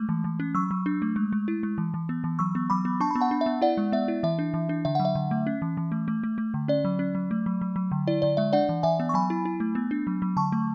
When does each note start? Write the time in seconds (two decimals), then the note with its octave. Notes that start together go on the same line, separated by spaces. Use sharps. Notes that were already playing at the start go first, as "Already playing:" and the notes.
Already playing: G#3 A3
0.09 E3
0.24 E3
0.40 C#4
0.55 F#3 C#6 E6
0.71 F#3
0.86 D4
1.02 A3
1.16 G#3
1.33 G#3
1.48 E4
1.63 G#3
1.78 E3
1.94 E3
2.09 B3
2.24 E3
2.39 F#3 C#6 E6
2.55 B3
2.70 F#3 B5 D6
2.85 B3
3.00 D4 A5 C#6
3.11 B3 B5
3.21 F#5 A5
3.31 D4
3.41 E5
3.46 B3
3.61 E4 D5 F#5
3.77 G#3
3.92 B3 E5
4.08 E4
4.23 E3 E5
4.39 D4
4.54 E3
4.69 D4
4.85 D3 E5
4.95 F#3 F#5
5.05 E5
5.15 D3
5.31 A3
5.47 C#4
5.62 E3
5.77 E3
5.92 A3
6.08 A3
6.23 A3
6.38 A3
6.54 D3
6.68 C#4 D5
6.85 F#3
6.99 C#4
7.15 F#3
7.31 A3
7.46 F#3
7.61 F#3
7.76 F#3
7.92 D3
8.07 E4 D5
8.22 D3 D5
8.37 G#3 E5
8.53 D4 D5 F#5
8.69 E3
8.83 E3 E5 G#5
9.00 B3
9.09 C#6
9.14 F#3 G#5 B5
9.30 E4
9.45 E4
9.60 A3
9.75 B3
9.91 D4
10.07 F#3
10.22 F#3
10.37 D3 A5 C#6
10.52 A3